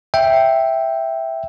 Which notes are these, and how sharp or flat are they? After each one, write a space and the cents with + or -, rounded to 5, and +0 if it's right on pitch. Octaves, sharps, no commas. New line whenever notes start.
E5 +0 G5 +0